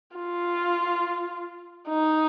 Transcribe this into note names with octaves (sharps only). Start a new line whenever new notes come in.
F4
D#4